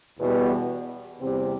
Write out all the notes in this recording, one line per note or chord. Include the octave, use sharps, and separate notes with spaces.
E2 B2 G3 B3
E2 C3 G3 C4